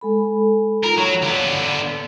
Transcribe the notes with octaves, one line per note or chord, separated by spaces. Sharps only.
G#3 A4 B5
D#4 F4 A#4 B5
F#3 C#5 A#5
D3 B3 F5